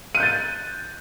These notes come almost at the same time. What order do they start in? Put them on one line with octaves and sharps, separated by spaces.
D#7 F#6 G6 A6